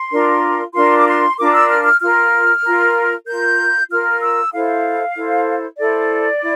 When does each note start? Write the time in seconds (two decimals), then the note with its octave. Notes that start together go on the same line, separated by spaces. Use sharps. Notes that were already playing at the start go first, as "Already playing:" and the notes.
Already playing: C6
0.12 D4 F4 A#4
0.75 D4 F4 A#4 C6
0.98 D6
1.07 C6
1.38 D4 F4 A#4 D6
1.53 E6
1.69 F6
1.84 F6
2.00 F4 A#4 F6
2.63 F4 A#4
3.26 F4 A#4 G6
3.89 F4 A#4 F6
4.21 E6
4.52 E4 A4 C5 F5
5.15 E4 A4 C5
5.78 E4 A4 C5 D5
6.41 E4